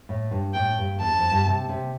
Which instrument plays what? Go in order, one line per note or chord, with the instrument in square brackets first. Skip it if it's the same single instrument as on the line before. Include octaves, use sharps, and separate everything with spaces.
[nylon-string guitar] A2
G2
[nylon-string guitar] A2 [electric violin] G5
[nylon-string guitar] G2
[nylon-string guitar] E2 [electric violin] A5
[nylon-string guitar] F2
G2
C3
C3